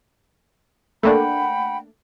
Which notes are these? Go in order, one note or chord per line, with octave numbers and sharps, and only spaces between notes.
A3 A#3 D4 F#5 G5 B5